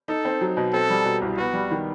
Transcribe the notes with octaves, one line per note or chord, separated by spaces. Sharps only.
D#4 A4
C4
F#3
B2
C4 A4
G3
B2
C2
B3 F#4
G3
D#3